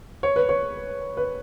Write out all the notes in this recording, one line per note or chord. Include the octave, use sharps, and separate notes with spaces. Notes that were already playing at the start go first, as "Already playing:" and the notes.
C#5
B4
C#5
B4